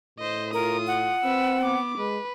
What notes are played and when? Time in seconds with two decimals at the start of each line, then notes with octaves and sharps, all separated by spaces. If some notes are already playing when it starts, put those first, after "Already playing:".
0.19 A2 C5 D#5
0.53 F4 A#4 D#6
0.87 F#5
1.25 C4 B4 E6
1.62 B3 D6
1.98 G#3 B4